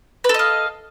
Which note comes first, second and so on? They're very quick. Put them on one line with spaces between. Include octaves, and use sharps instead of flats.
B4 A4 D#5 F5